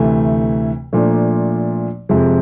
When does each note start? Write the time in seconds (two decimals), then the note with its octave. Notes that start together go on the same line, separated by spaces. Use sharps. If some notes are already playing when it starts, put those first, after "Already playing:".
Already playing: D2 C3 E3 A3
0.93 A#2 F3 A3 D4
2.09 F2 C3 F3 G#3